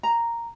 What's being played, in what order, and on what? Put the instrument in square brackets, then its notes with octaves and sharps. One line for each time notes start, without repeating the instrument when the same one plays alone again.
[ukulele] A#5